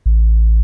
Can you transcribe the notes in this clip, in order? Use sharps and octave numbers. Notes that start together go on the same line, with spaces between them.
A1